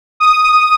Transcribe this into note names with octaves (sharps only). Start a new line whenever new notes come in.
D#6